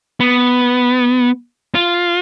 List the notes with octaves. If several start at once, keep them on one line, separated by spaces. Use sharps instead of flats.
B3
F4